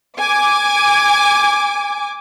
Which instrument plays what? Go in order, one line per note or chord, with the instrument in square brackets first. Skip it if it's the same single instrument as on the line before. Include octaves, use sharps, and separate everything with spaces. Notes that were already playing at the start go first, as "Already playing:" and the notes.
[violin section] G#5 D6